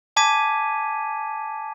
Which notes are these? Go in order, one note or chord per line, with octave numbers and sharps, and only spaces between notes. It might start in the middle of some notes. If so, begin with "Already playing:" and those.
G#5 A5 D6 G#6 B6 D#7